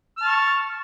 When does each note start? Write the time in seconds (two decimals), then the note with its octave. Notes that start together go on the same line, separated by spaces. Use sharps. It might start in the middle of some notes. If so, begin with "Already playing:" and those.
0.18 F6
0.22 A5
0.26 C#6